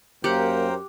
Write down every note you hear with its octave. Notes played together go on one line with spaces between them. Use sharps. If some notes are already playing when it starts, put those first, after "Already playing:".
F#2 A#3 G4 A#4 C5 F#5 G5